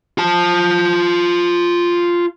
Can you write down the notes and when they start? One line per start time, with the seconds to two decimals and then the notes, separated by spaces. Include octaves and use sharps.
0.18 F4 A5